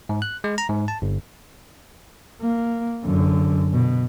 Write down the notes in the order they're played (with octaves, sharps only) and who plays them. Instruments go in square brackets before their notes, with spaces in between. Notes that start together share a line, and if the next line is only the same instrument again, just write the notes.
[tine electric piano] G#2
F#6
G#3
A#5
G#2
A5
G1
[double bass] A#3
F#2 D3
B2